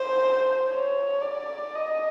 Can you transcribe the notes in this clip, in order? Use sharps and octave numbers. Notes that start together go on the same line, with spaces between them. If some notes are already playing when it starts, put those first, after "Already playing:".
Already playing: C5
C#5
D5
D#5